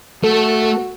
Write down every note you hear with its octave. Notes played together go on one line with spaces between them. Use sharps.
A3 F#4 A4